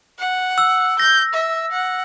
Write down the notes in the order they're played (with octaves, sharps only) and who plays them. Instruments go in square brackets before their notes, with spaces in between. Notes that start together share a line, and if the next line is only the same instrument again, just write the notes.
[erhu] F#5
[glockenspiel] E6
[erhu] G6 [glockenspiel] A#6
[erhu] E5
F#5